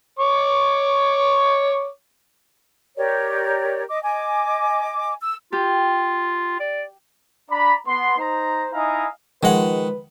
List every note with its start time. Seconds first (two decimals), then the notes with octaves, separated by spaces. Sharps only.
0.19 C#5 C#6 D6
2.97 G4 A#4 C#5 D5
3.89 D#5 D6
4.02 D#5 G#5 D6
5.22 E6
5.52 F4 G4
6.60 D5
7.51 D4 D5 A#5 B5
7.87 B3 C6
8.18 D#4 C5 A#5
8.73 D#4 E4 D#5 F5 G#5 A#5
9.43 D#3 F3 G#3 B4 F#5